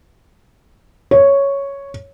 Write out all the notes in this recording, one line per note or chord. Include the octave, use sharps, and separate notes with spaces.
C#5